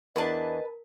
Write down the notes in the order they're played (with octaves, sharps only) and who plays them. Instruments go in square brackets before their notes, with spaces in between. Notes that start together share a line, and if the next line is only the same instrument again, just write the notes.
[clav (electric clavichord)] E2 D4 [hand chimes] A#4 [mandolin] B4 G#5 A5 [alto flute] D#5